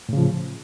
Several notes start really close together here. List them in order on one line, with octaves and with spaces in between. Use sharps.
A2 C#3 F3